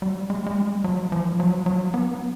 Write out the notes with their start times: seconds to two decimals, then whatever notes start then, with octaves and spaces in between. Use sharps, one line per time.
0.02 G3
0.30 G#3
0.46 G#3
0.58 G3
0.84 F#3
1.12 F3
1.40 F#3
1.66 F#3
1.94 B3